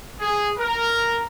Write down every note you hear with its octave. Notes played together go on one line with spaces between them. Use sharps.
G#4
A#4